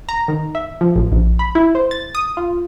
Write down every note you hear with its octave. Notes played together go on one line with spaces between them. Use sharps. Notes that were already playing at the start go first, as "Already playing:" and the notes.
A#5
D#3
E5
F3
A1
A#1
B5
E4
C5
A6
D#6
F4